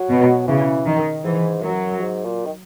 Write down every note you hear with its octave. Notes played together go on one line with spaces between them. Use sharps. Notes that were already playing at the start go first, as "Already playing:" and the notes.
Already playing: F#3
B2
C#3 E3
D#3
G#2 E3
F#2 F#3
G#2
A#2
D#3